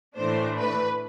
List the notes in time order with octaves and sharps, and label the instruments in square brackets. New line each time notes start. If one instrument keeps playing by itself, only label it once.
[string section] A2 E3 A3 D4 C5
B4